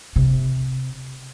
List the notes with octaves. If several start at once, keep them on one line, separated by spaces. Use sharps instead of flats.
C3